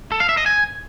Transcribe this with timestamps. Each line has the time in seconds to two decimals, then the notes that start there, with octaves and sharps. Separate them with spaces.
0.12 A4
0.20 F5
0.29 E5
0.37 D#5
0.46 G#5